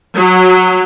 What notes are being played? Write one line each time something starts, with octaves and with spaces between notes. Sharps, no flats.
F#3